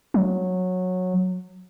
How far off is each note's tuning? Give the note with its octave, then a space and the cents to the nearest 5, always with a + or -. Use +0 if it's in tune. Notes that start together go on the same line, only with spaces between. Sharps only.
F#3 -15